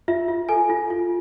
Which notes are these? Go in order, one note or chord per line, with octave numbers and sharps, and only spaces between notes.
F4 E5
F4
A4 G#5
F4
F4